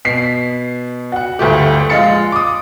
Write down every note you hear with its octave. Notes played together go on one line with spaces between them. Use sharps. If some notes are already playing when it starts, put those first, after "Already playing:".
B2 B6 C7
F#4 F#5
G1 D2 A3 G4
A#1 G#3 F5 A6 C#7
D6 D#6